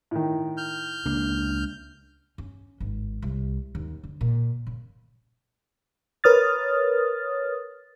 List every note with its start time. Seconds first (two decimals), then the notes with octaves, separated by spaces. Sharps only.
0.11 A2 D#3
0.57 F6 G6
1.05 C#2 A#3 D4
2.38 C#4
2.80 G#1
3.22 C2
3.75 D#2
4.03 D3
4.21 A#2
4.67 C#3
6.24 A#4 B4 C#5 D#6 F6 A6